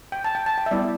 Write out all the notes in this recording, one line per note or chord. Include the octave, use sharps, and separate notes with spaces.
G5
A5
G5
A5
G5
E5
G3 B3 E4 D5